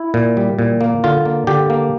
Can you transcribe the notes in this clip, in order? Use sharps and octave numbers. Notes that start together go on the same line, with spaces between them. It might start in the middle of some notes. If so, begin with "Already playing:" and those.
Already playing: E4
A#2
G3
A#2
A#3
D3 F4
A#3
D3 G4
A#3